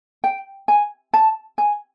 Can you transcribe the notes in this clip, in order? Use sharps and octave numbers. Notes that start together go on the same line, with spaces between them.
G5
G#5
A5
G#5